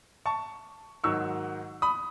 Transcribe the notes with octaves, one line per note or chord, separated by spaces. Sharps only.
A5 C#6
G#2 D#3 F#3 C#6 E6
B5 D#6